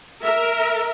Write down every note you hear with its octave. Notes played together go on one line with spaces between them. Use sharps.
A#4 E5